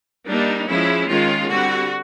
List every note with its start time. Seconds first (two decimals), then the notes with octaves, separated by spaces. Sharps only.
0.27 G3 A#3 D4 D#4
0.68 F3 G#3 C#4 E4
1.09 D#3 G#3 C#4 F4
1.50 D3 G3 C4 F#4